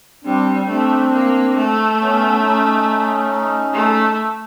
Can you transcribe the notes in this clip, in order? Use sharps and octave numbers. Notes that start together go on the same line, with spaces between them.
G3 C4 D4
A3 C4 D4
A#3
A3
B3 C#4
C#4 D#4
A3